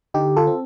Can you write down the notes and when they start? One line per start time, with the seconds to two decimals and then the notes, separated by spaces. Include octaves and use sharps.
0.14 D3 D#4 G4
0.36 F4 A4
0.47 C4